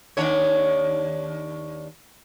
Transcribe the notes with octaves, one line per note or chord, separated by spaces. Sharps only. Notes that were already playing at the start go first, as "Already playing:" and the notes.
D#2 D4 C#5